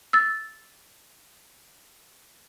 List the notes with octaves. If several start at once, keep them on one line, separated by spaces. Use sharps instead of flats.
E6 A6